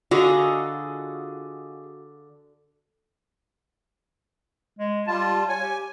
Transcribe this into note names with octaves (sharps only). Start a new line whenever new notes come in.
D3 F4 F#4 G#4 D#5 A#5 C#6
G#3
G3 F4 A5
C#5 G#5
G4